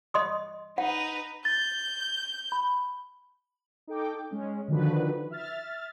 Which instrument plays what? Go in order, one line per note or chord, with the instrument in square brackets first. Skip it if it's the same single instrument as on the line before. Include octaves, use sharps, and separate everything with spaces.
[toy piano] D#5 C6 D#6
[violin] D#4 B4 [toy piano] F#5
[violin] G6 [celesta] A6
[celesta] B5
[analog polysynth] D#4 A4 G5 D6
G#3 C#4
D3 D#3 F3 D4 F#4 B4
E5 F6 A6